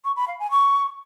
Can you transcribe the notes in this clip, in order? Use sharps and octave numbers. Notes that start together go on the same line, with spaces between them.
C#6
B5
F5
G#5
C#6